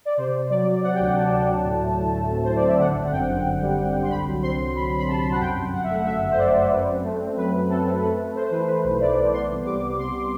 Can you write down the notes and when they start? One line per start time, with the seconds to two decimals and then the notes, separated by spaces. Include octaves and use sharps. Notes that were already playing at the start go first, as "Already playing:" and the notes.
0.05 D5
0.17 C3 C5
0.33 C3
0.50 F#3 D5
0.66 F#3
0.82 C3 F#5
0.94 G5
0.99 D2
1.05 F#5
1.15 F#3 A5
1.32 D2
1.48 F#3
1.64 A2
1.81 A3
1.97 A2
2.14 A3
2.30 C4
2.44 A2 C5
2.56 D5
2.62 C4 E5
2.78 D3 F#5
2.95 G1
3.04 F#5
3.12 F#2 G5
3.27 G1
3.44 F#2
3.61 G3
3.77 G1
3.93 D3
4.03 C6
4.10 C2 B5
4.26 F#3
4.42 C4 C6
4.58 C2
4.75 F#3 B5
4.91 F#3
4.98 B5
5.08 C3 A5
5.24 C2
5.31 F#5
5.40 F#2 G5
5.57 G1
5.73 G1 F#5
5.84 E5
5.89 A3 F#5
6.05 F#2 E5
6.22 G1
6.31 C5
6.38 G1 D5
6.55 F#2
6.71 F#2 B4
6.87 C4
7.04 A3
7.20 C4
7.36 F#3 B4
7.53 F#3
7.69 A3 A4
7.86 C4
8.02 A3 B4
8.19 A3
8.35 A3 C5
8.46 C5
8.50 E3 B4
8.67 E3 B4
8.84 B1
9.01 A3 D5
9.16 B1
9.33 B3 C6
9.49 C2
9.66 G3 D6
9.82 B3
9.98 C3 C6